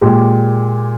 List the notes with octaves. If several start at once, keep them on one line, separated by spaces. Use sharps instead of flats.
A#2 G#3 G4